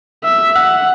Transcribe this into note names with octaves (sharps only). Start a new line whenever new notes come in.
E5
F#5